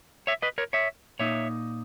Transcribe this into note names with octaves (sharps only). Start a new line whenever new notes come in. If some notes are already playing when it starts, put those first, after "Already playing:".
C#5 E5
B4 D#5
A#4 C#5
C#5 E5
A#2 A#3 D#4 C#5 E5